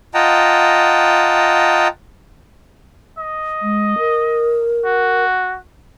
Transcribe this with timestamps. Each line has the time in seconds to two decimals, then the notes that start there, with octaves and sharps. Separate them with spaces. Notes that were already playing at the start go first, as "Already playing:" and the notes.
0.14 F4 D#5 F#5 G5 A5 A#5
3.18 D#5
3.62 G#3
3.99 A#4
4.85 F#4